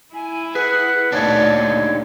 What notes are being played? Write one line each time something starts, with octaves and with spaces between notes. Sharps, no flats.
E4 G#5
G#4 B4 F#5
D2 A#2 D4 D#4 G#4 C#5 D5